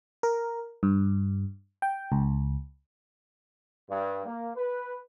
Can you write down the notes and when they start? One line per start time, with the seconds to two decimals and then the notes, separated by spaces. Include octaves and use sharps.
0.23 A#4
0.83 G2
1.82 G5
2.12 C#2
3.90 G2
4.26 A#3
4.56 B4